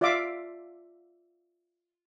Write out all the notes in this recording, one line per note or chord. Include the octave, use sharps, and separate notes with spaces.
F4 D5 E5 F5 D6